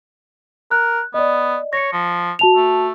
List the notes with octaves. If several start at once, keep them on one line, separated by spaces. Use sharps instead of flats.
A#4 F#6
B3 D5 D#5
C#5 A#6 C#7
F3
F#4 A5 F7
A3